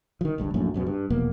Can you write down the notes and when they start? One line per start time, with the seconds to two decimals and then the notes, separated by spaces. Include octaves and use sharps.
0.21 D#3 F3
0.38 G1 C#2 G2
0.54 A#1 F#2 A2
0.74 C#2 F#2 B2
0.87 G2
1.10 F1 E2 B2 A#3